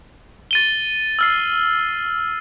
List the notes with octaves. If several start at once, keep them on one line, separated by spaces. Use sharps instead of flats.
A6 D#7 G7
E6 F6 C7